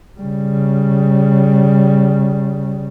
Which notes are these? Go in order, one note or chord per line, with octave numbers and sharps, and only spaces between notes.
C#3 G3